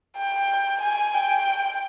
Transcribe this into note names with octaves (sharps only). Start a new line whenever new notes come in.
G5
G#5
G5